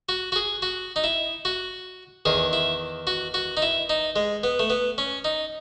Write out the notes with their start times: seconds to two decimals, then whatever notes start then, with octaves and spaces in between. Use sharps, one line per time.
0.09 F#4
0.32 F#4
0.36 G#4
0.62 F#4
0.96 D#4
1.04 E4
1.45 F#4
2.25 E2 D#3 G#4
2.53 E4
3.07 F#4
3.34 F#4
3.57 D#4
3.62 E4
3.89 D#4
4.16 G#3
4.43 B3
4.59 A3
4.70 B3
4.98 C#4
5.24 D#4